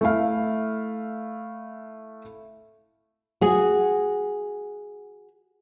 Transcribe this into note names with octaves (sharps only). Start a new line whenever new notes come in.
A3 E4 F5
F#4 G#4